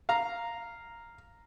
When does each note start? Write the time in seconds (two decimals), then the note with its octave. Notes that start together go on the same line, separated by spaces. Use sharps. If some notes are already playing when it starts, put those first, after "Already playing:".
0.09 F5 A#5